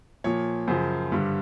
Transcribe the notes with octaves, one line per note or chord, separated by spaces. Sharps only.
A#2 F3 C#5
F#2 C#3 F3 C5
G2 D3 G3